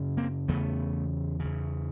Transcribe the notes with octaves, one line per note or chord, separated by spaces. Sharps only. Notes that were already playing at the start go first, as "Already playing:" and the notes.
Already playing: F#2 C#3
A#3 C4
E2 C#3 A3 B3
C#3
E2